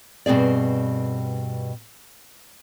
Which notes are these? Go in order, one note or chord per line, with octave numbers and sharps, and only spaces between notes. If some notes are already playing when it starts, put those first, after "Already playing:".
G2 B2 C4 G#4 D5